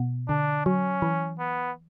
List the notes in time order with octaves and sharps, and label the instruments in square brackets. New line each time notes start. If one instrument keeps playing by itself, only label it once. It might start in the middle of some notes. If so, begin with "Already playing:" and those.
Already playing: [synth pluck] B2
[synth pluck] D3 [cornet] D4
[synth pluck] F#3 [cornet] C#4
[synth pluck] E3
[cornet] B3